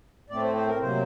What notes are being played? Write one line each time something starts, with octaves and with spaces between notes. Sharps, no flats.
A2 A3 C4 D5
C5
C5
A#4
C3 F#3 A#3 C5